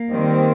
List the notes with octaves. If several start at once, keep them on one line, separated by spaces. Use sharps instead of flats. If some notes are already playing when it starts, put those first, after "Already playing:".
Already playing: A#3
D#3 G3 C4